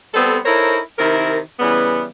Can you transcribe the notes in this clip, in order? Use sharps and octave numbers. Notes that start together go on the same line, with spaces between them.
G3 B3 C4 A4
D#4 E4 A4 A#4 C5 C#5
C3 D#3 E4 A#4
C#3 E3 G3 B3